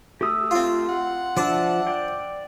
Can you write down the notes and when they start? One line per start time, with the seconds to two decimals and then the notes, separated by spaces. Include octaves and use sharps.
0.21 A3 G4 D#6 E6
0.51 C4 F4
0.88 F#5
1.37 F3 D4 E5 A5
1.87 D5 G5